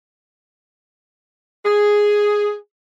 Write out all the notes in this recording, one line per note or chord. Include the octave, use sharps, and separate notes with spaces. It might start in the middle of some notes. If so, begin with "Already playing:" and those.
G#4